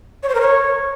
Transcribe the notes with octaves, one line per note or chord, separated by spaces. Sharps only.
C#5
C5
A#4
C#5